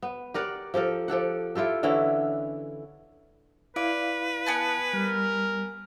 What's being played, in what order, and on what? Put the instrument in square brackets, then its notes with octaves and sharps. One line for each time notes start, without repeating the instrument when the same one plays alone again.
[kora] B3
G4 A#4 D5 F#5
F3 G4 A4 A#4
F3 G4 A4 F#5
E4 F4 G4 A4
D3 E3 C#4 E4
[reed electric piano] E4 F5 [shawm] B4 [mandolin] D5
[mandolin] B3 G#5 A5
[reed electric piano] G3 [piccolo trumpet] A#4